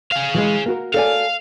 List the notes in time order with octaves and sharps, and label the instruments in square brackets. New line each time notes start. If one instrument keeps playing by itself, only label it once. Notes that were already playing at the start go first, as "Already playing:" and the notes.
[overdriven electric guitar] G#4 F5
[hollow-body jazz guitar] E3 F3 G#3
A#3 F#4 A#4
[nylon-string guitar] A4 D5 G#5 [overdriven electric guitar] F5